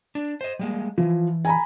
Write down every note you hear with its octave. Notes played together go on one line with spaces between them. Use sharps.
D4
C5 D#5
G3 G#3 A#3
E3 F3
G#5 A#5 B5